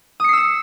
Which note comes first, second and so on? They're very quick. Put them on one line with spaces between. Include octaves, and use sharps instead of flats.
D#6 C#7 C7 E6 E7